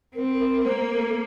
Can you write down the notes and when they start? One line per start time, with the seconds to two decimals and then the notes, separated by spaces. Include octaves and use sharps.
0.15 C4 A#4
0.40 A#4
0.64 A#3 C5
0.81 A#4
0.97 A4